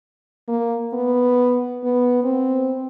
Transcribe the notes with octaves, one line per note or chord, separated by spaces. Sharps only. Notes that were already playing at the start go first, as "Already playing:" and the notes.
A#3
B3
B3
C4